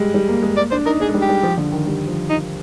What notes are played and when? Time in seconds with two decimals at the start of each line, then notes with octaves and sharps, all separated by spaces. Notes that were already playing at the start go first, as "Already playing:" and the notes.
Already playing: G3 G#3
0.14 G3
0.28 A#3
0.42 G#3
0.57 A#3 D5
0.71 D4 C5
0.86 D#4 A#4
1.00 D4 G#4
1.09 G#3
1.14 G3
1.22 G4
1.29 G3
1.43 F3
1.57 D3
1.72 D#3
1.86 G3
2.07 F3
2.30 D#4